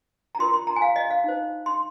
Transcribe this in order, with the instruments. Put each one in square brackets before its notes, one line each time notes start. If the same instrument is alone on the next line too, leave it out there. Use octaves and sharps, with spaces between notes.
[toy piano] A#5
F4 A#4 C6
C6
A#5
G#5
F5
D#5
F5
D#4 C5
C6